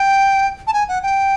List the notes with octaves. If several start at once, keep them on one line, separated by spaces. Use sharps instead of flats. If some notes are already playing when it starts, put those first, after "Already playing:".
Already playing: G5
A5
G#5
F#5
G5